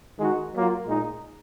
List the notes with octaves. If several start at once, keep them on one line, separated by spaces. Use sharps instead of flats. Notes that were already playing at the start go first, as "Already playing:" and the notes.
D#3 G#3 D#4 F#4
F#3 A#3 F4
A#2 G#3 D#4